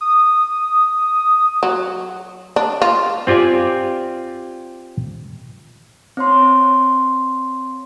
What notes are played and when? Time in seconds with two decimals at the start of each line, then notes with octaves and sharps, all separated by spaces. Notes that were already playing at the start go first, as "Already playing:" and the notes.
0.01 D#6
1.63 F#3
2.56 D4
2.82 F4
3.27 C4 F4 G4 D5 G#5
6.17 C4 C#5 C6